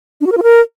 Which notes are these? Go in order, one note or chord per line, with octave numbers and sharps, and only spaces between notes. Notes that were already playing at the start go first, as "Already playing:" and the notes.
D4
F#4
A#4
F4
A#4